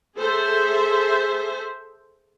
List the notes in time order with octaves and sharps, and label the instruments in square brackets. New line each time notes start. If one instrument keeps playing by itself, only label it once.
[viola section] G#4 A4 C5 E5